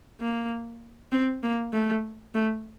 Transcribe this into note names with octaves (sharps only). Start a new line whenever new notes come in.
A#3
C4
A#3
A3
A3